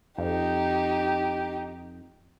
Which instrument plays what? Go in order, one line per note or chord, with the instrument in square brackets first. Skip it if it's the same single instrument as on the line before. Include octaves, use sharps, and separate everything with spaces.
[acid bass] F2 [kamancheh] D#4 G4